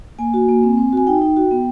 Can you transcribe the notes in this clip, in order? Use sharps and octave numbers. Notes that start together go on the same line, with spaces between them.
A#3 G#5
F#4
A#3
C4
C4
F#4 G#5
D#4 G5
D#4
F#4
B3